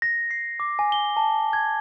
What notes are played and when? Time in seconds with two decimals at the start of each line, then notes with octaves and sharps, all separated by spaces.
0.02 A#6
0.31 C7
0.60 D6
0.79 G#5
0.92 G7
1.17 A5
1.53 G#6